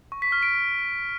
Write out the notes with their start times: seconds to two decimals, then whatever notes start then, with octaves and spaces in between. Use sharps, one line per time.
0.12 C#6
0.22 B6
0.32 F6
0.43 D7